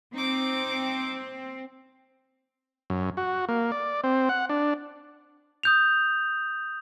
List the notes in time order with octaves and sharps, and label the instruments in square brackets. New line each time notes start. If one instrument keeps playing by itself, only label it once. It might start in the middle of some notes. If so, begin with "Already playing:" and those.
[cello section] C4 [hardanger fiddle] D#4 D6
[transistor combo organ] F#2
F#4
A#3
D5
C4
F#5
D4
[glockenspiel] D#6 G6 F7